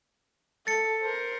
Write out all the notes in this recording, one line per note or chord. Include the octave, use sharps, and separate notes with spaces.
A4 A6 C#7
A#4 C5